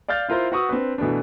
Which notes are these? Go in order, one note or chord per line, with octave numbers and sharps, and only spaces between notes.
D5 F5 F6 G6 A6
E4 F4 A#4 C5
F#4 B4 F#5 C#6 D#6 E6
C4 D4 B4
B2 E3 A3 B3 D4